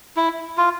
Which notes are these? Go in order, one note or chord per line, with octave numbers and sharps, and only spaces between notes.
E4
F4